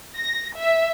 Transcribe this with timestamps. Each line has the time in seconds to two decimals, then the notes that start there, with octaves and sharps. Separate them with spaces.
0.17 A#6
0.57 E5